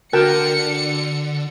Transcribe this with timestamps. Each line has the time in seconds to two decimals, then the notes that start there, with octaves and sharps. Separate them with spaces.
0.13 D3 F#4 A#4 G5 A5 C#7